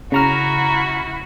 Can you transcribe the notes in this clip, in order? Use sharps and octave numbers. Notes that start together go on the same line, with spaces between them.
C#3 E4 F#4 A#5 F6